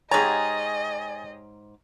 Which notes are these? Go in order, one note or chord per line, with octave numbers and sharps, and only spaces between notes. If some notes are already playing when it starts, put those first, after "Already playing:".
G#2 G4 G#4 C#5 D#5 G#5 A#5 A6